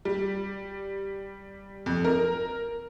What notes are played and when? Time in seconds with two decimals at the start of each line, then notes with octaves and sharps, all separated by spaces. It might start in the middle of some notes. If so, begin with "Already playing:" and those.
0.05 G3
1.86 F2
2.05 A#4